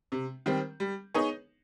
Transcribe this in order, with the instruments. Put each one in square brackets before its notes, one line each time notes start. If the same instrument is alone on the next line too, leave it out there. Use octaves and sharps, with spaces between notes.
[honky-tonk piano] C3
D#3 G3 C4
G3
B3 D#4 G#4 C#5